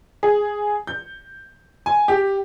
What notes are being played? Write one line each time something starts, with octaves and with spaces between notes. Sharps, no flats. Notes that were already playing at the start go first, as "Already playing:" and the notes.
G#4
G6
G#5
G4